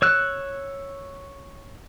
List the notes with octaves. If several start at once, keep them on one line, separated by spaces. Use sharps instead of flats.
C#5 E6 F#6